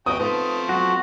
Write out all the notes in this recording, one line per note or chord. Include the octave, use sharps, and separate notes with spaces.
F#4 B4 D5 D#5 G5 D#6
F3 A3 B3 C4 D#4 B4
F#3 B3 F4 F#4